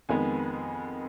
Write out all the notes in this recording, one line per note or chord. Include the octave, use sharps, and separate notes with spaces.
F2 D#3 G#3 B3 G#5